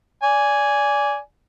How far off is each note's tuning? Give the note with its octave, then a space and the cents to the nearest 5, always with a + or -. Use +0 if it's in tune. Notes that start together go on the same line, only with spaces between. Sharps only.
D5 -20 G#5 +0